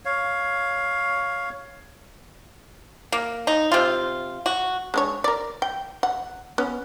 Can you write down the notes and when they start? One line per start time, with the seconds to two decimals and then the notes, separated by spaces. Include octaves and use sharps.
0.05 C#5 F5
3.12 A#3
3.47 D#4
3.72 C3 F4
4.46 F#4
4.94 G#3 D4 C#5
5.24 A#4 D5
5.62 G5
6.03 F#5
6.58 B3 C#4